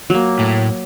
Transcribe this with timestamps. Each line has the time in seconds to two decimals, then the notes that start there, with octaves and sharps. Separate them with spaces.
0.10 F#3 A#3
0.39 A2